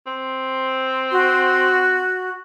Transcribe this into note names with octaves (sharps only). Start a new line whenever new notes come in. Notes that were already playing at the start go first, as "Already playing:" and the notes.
C4
F#4